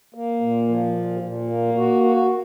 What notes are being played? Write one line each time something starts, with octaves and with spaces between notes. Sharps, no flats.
A#3
A#2
F3
A#2
A#2
A#3
F#4
F#4